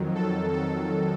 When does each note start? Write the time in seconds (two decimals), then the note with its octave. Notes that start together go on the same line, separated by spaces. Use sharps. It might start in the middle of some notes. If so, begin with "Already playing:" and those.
Already playing: F2 D#3 F#3
0.15 A4
0.52 A4